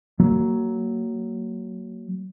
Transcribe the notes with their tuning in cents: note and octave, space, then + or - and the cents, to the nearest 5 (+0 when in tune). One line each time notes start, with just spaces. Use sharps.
F#3 +10 A#3 -20